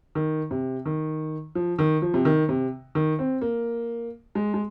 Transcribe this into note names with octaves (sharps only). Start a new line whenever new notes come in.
D#3
C3
D#3
F3
D#3
F3
C3
D#3
C3
D#3
C4
A#3
G#3
G#3